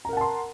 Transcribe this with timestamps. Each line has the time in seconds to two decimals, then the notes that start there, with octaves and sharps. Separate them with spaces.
0.05 A#5
0.09 A#4
0.13 F#5
0.17 A5
0.21 C6